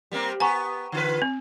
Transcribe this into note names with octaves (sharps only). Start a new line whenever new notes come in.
G3 A#3 C4
B3 G4 F#5 G#5 A#5 C#6
D3 F4 B4
C4